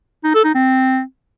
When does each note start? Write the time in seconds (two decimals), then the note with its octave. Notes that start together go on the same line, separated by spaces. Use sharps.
0.24 D#4
0.34 A4
0.45 D#4
0.55 C4